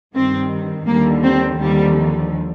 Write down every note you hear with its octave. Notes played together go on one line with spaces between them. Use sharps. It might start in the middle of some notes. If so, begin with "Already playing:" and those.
G2 D#3 G3 C4
D#2 D3 G3 A#3
C4
D#2 D3 F3 G3